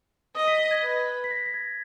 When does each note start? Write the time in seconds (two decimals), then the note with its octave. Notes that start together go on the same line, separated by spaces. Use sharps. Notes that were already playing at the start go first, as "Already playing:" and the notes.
0.35 D#5 D#6
0.47 B6
0.59 B6
0.71 G#6
0.82 B4
1.24 B6
1.31 A#6
1.46 A#6
1.54 G#6